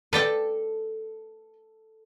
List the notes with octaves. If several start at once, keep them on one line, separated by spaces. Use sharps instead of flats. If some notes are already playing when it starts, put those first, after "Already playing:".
A4 B4 D5 G5